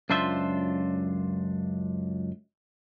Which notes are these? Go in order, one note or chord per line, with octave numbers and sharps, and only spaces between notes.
C#2 F#2 D4 F4 C5 E5